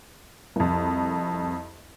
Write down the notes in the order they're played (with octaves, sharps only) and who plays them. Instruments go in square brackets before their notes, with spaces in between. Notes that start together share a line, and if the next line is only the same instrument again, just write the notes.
[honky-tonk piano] C2 F2